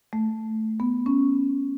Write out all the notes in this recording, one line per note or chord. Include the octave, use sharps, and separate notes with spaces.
A3
B3
C#4